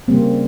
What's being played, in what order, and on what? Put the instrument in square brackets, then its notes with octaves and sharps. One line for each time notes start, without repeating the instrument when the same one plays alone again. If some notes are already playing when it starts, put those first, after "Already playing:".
[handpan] C#3 G3 A#3 C4